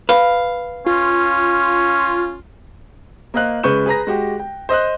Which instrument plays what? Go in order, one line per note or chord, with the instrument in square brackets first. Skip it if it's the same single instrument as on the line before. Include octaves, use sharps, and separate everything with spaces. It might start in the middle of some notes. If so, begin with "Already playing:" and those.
[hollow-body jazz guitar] B4 [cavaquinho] F5
[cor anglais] C#4 [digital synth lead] F4
[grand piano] A#3 C5 D#5 F5 F#6
C#3 G#3 B4 C#6 G6 E7
G#4 B4 A#5 A#6
G#3 F#4 G4
G5
C5 D#5 D#6 F#6